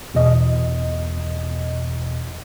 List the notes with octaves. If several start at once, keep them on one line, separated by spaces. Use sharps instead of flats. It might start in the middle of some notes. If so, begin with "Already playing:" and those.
E2 B2 D#5